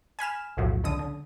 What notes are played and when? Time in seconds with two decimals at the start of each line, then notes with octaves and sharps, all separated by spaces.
0.19 G#5 B5 F6 E7
0.57 B1 E2 A2 F3 F#3
0.84 C#2 D3 D#6
0.99 D3